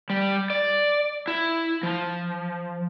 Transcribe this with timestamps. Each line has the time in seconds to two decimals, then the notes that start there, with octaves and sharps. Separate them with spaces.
0.10 G3
0.50 D5
1.28 E4
1.83 F3